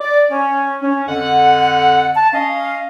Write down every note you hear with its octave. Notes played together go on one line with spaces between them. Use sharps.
D5
C#4
C#4
F2 D3 F#5
A5
C#4 D#5 F5